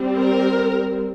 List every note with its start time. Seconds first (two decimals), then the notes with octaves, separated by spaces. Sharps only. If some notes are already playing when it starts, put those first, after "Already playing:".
Already playing: G3 C4
0.16 A#4